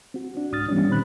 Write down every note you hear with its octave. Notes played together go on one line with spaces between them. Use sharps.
C4 F#4
D4 F#4
C2 G#2 D#6 F6 A6
E3 G3 B3 C#4 D4
A#2 D#3 C4 B5 F#6